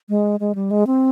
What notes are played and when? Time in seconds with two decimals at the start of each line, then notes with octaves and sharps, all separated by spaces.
0.09 G#3
0.40 G#3
0.55 G3
0.71 G#3
0.87 C4